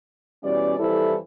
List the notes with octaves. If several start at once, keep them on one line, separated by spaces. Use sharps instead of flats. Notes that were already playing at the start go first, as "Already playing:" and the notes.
B2 E3 G3 C#4 D5
F2 E3 G3 E4 A4 C5